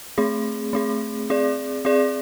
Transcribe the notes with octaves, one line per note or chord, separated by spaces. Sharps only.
A3 C4 G#4
A3 C4 G#4
C4 G#4 D5
C4 G#4 D5